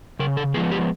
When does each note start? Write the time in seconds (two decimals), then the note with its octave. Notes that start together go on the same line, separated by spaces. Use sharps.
0.19 C#3 A#4
0.37 A4
0.54 F3 G#3 B3 G#4
0.71 G4